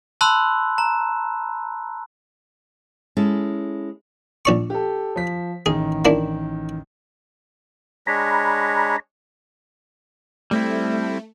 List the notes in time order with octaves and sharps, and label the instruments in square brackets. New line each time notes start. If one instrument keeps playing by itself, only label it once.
[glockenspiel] A5 B5 C6 E6 F#6
A#5
[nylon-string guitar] G#3 C#4 E4 A4
[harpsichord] A#1 D5 C#6
[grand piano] G4 A4
F3 B6
[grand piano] A1 D#3 [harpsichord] G#4
[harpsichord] A#3 D4 E4
[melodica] G#3 D4 C#5 [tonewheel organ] A#5 B5
[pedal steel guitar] G3 C4 E4 [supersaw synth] A3